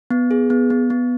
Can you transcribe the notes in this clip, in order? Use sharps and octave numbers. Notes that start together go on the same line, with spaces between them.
B3
G#4
B3
B3
B3